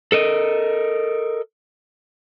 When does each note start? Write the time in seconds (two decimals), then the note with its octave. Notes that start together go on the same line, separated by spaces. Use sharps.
0.12 A4 A#4 D#5